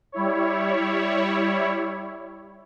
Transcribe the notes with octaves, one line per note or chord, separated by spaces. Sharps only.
G3 E4 C#5